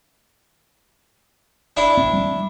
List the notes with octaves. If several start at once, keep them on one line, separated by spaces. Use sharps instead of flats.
D4 E4
C4
G3